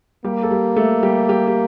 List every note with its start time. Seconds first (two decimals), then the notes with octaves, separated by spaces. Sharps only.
0.24 G3 A#3 G4
0.43 A4
0.51 G3 G4
0.76 A3 A4
1.03 G3 G4
1.29 G3 G4
1.47 G4